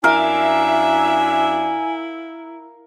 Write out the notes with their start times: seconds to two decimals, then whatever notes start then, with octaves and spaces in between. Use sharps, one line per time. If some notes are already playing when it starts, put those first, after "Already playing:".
0.04 F#2 D4 E4 A#4 E5 F5 G#5